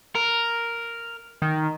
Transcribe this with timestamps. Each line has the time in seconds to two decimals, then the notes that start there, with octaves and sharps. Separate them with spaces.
0.15 A#4
1.42 D#3